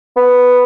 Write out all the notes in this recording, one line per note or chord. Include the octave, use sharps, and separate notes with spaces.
B3